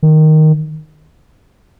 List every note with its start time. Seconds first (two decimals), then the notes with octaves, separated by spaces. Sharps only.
0.03 D#3